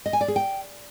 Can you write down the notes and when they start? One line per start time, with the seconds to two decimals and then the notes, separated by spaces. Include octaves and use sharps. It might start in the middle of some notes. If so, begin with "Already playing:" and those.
0.06 D#5
0.13 G#5
0.21 D5
0.28 G#4
0.36 G5